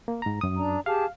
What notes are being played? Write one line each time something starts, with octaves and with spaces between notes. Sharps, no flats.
A#3
G#2 A#5
F#2 D#6
D4 D5 A#5
G4 G#4 F5 A5